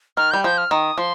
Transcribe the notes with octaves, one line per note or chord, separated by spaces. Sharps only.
D#3 F6
G3 G6
F3 G6
F6
D#3 D#6
F3 C6